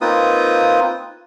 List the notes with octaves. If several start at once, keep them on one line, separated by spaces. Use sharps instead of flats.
A#3 C4 D#4 F4 B4 D#6